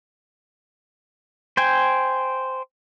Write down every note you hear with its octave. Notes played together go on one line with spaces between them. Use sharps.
C5 G5 G#5